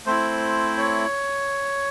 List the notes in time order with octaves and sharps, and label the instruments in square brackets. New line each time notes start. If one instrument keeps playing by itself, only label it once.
[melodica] A3 C4 E4 C5
C#5